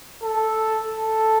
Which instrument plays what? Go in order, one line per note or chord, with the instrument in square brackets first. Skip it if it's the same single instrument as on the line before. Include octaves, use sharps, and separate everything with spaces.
[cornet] A4
A4